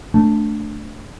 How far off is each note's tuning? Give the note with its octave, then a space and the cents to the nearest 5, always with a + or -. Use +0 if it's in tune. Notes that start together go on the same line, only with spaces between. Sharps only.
A3 +0 D4 +0